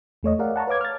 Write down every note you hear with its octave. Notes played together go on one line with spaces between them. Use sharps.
E2 A3 C#5 D#5
G#4 A#4 D5 F5 F#5
F#5 A5 A#5 C#6
B4 C#5 F5 D6 G#6
F6 A6